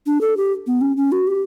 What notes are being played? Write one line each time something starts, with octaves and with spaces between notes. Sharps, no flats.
D4
A4
G4
B3
C#4
C#4
F#4
G4